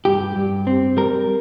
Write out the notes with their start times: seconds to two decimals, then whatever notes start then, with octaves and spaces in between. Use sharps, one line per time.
0.05 G2 G4
0.36 G2
0.67 C4
0.97 G3 A#4